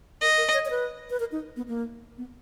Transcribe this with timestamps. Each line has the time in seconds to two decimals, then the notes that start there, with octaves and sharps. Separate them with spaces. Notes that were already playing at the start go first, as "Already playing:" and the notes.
0.21 A#4 D#5
0.38 A#4
0.54 C#5
0.65 C#5
0.70 B4
1.10 B4
1.20 A#4
1.32 D#4
1.56 B3
1.68 A#3
2.18 B3